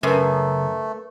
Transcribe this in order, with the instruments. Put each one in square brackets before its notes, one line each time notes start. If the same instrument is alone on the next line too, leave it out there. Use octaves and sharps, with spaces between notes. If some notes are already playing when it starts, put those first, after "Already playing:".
[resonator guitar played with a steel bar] F#2 [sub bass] C#3 [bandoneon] A3 [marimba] A#4 B4